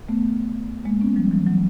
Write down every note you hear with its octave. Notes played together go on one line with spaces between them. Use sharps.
A3 B3
G#3 A#3
B3 C#4
F3 G3
E3 F#3
E3 F#3